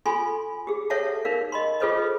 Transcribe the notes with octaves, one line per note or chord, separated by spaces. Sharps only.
F4 A4 G#5 B5 C6
G4 G#4
A4 C#5 E5 F#5 A5
D#4 A#4 F5
D#5 B5 C6
F4 G#4 A4 B4 C5 D#5